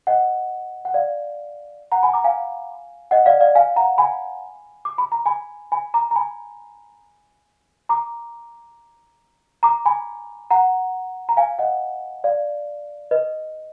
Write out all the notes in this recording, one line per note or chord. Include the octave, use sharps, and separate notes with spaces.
D#5 F#5
F#5
D5 F5
F#5 A#5
G#5 B5
A#5 D6
F5 G#5
D#5 F#5
D5 F5
D5 F5
F5 G#5
F#5 A#5
G#5 B5
D6
B5
A#5
G#5 B5
G#5 B5
A#5 D6
A#5
G#5 B5
A#5 D6
A#5 D6
G#5 B5
F#5 A#5
A#5
F5 G#5
D#5 F#5
D5 F5
B4 D#5